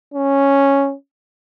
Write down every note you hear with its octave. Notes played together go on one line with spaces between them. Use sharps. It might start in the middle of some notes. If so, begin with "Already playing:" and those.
C#4